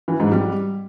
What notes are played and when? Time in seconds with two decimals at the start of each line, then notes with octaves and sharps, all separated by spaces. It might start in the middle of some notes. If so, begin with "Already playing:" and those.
0.08 E3
0.20 G#2
0.32 G3